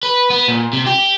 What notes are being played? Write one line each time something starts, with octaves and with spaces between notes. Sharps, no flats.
B4
B3
A#2
C3
G4